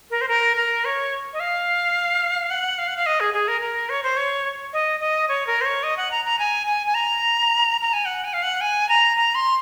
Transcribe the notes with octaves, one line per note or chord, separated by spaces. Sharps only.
A#4
C5
A#4
A#4
C#5
D#5
F5
F#5
F5
F#5
F5
D#5
G#4
G#4
A#4
A#4
C#5
C5
C#5
D#5
D#5
C#5
A#4
C5
C#5
D#5
F#5
A#5
A#5
G#5
G#5
G#5
A#5
A#5
G#5
F#5
G#5
F5
F#5
G#5
A#5
A#5
C6